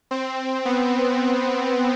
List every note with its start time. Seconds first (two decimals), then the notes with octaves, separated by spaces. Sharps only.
0.11 C4
0.65 B3